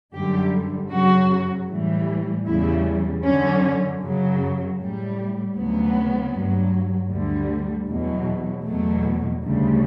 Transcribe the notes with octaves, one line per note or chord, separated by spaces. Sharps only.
F#2 D3 G3 G4
F#2 C#3 F#3 F#4
A2 E3 G3
E2 C#3 G3 E4
F#2 D3 F#3 C#4
F#2 C#3 F#3
A2 G3
D2 C#3 F#3 B3
G2 F#3
D2 D3 G3
E2 B2 F#3
E2 B2 F#3 A3
D2 C#3 G3